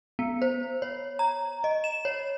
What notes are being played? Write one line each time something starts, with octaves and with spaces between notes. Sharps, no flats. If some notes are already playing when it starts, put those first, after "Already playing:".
B3
C5
C#5
A#5
D#5
E7
C#5